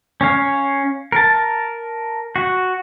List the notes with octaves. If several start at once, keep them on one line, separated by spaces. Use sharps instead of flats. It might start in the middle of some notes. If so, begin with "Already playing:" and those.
C#4 C#5 F5
A#4 A5
F#4